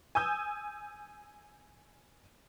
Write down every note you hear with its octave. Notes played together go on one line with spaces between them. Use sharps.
G#5 D#6 E6 G6